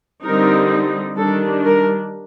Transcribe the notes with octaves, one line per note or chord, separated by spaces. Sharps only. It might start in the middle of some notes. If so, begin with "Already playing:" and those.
D3 G3 C4 D#4 A#4
D#3 G3 D4 A4
A#4